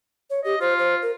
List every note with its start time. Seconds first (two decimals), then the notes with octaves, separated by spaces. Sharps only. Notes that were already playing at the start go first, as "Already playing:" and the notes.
0.30 C#5
0.45 G4 D#5
0.61 F4 C5
0.79 C5
1.02 A#4